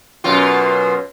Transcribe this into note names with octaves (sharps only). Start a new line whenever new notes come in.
F#2 B2 F4